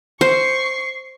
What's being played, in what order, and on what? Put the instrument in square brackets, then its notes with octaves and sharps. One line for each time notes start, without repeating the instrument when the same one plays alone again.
[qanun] C5 [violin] C#6 C7